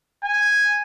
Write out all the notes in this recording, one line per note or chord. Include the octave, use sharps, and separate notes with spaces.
G#5